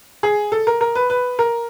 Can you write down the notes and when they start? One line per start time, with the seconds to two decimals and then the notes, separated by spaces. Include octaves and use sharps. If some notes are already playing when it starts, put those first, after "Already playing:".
0.23 G#4
0.52 A4
0.67 A#4
0.81 A#4
0.95 B4
1.10 B4
1.39 A#4